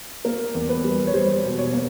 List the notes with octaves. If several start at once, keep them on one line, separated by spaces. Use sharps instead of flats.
A#3 A#4
E2
B4
G3
C#5
G3 C5
B2
C#5
A#3